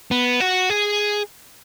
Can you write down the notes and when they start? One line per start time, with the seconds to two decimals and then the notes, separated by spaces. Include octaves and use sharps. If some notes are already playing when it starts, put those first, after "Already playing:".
0.11 B3
0.40 F#4
0.70 G#4